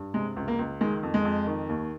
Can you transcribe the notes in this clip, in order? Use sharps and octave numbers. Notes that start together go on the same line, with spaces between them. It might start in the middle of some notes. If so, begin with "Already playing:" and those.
Already playing: G2
C3 G#3
C#2
A#3
C#2
D#3 G#3
F2
G#3
F2
D#3
D#2